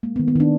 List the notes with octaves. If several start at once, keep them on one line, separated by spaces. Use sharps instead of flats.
G#3 A#3
B3
D#3
B3
D#3 D4